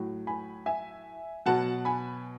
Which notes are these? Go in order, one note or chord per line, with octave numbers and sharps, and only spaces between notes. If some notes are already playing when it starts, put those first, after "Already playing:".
Already playing: A2 F#3
G#5 B5
E5 G#5
B2 F#3 F#5 A5
G#5 B5